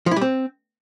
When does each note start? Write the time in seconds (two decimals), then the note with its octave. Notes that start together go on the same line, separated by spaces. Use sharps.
0.06 F3
0.11 E4
0.16 G3
0.21 C4